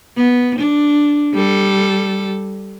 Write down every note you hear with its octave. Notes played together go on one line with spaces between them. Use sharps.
B3
D4
G3 A4